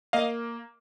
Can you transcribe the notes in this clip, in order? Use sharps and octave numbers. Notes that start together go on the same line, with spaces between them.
A#3 D#5 F5